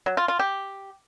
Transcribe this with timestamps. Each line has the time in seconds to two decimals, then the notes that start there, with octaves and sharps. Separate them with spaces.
0.06 F#3
0.17 F4
0.28 F4
0.39 G4